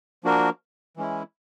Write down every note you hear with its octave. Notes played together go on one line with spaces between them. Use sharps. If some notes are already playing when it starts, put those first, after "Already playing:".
F3 A#3 D4 F#4 A#4
E3 G#3 C#4 E4